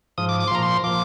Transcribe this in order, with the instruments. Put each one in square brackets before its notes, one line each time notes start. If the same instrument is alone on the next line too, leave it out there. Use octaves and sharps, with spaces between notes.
[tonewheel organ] G#2 F3 D#6
D6
D6
C6
A#2 F3 A#5
C6
A#2 F3 D6